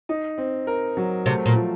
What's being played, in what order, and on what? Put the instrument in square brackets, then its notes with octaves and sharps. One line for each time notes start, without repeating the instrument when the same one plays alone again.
[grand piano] D#4
C4
A#4
F#3
[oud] C3 [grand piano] A3
[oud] A#2
[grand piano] F3